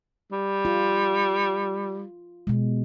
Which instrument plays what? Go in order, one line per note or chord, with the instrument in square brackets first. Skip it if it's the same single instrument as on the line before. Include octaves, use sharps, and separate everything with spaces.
[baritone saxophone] G3
[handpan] F4
B2 G#3